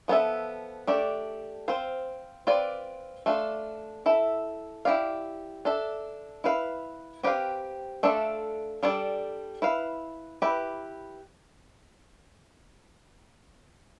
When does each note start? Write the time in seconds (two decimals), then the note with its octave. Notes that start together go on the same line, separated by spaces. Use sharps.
0.08 F3 B3 D4 A4 E5
0.87 A3 D4 G4 D5
1.68 C4 F4 C5
2.47 C4 F4 B4 D5
3.26 A3 D4 F4
4.06 E4 A4 E5
4.85 E4 G4 D5 F5
5.65 D4 A4 E5
6.44 E4 B4 F5
7.23 C4 G4 B4 D5 F5
8.03 A3 D4 F4 A4 E5
8.83 G3 D4 A4 D5
9.62 E4 B4 F5
10.42 E4 G4 B4